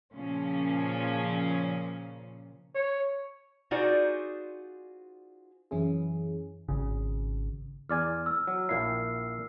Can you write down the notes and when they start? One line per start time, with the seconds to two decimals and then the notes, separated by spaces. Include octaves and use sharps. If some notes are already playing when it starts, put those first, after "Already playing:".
0.13 A#2 C#3 F3 C#4
2.75 C#5
3.71 D#4 F4 F#4 G#4 C5 D5
5.71 F#2 E3 C#4 E4 G#4
6.69 G#1 C#3
7.89 E2 D5 G#5 F6
8.26 E6
8.47 F#3
8.69 A#1 A#2 E4 C7